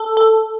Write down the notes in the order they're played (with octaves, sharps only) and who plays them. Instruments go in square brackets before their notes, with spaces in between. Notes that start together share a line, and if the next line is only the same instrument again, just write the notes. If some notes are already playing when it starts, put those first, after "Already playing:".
Already playing: [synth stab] A4
A4